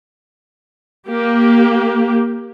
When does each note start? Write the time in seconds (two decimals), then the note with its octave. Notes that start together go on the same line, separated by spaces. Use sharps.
1.07 A#3 G4